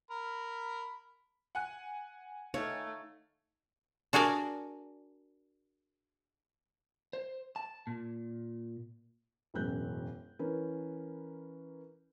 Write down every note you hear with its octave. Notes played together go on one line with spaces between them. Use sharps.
A#4 B5
F#5 G#5 F#6
A3 D#4 C#5 F5
D4 F#4 G#4 A#4 D5
C5
A5
A#2
E1 A1 F#2 F#6 G6
E3 C#4 A#4 B4